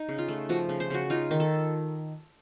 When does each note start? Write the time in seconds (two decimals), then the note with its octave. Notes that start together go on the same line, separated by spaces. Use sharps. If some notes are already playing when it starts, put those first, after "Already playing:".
Already playing: D#4
0.09 C#3
0.18 F4
0.29 A3
0.49 F3 F#4
0.69 C#3
0.80 C5
0.90 C#3 F#4
1.10 D#4 F4
1.31 D#3
1.40 A4